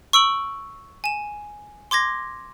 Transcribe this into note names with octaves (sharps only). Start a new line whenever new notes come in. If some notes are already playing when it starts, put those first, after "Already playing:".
C#6 E6 D7 F#7
G#5 E7
C6 D6 G#6 A#6